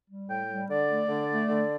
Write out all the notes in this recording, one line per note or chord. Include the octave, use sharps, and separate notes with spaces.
G3
A2 G5
G3
D3 D5
A3
D3
A3
D3